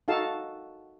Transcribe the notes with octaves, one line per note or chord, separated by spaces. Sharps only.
D#4 F#4 A4 F5 A5